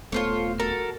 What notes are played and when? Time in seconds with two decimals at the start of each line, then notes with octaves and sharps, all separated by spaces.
0.12 D#1 A3 B3 F4 A4 C5 C#5
0.60 F#4 A4 A#4